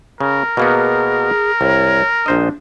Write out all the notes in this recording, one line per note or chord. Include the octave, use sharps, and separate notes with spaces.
C#3 A#4
B2 A#3 B3 G#4
C2 C#5
A#1 D4 C5 D#5